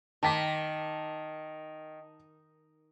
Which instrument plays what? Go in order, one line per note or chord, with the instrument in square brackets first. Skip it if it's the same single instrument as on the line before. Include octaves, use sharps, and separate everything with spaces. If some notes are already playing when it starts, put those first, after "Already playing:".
[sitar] D#3 [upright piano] A5 D6 B6